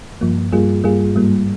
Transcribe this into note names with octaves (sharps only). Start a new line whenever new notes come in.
G2 F3 A#3
G2 G3 A#3 F4 G#4
G2 G3 A#3 F4 G#4
G#2 G3 A#3